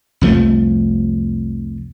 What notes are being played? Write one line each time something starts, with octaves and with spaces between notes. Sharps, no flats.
C2 F2 F3 A3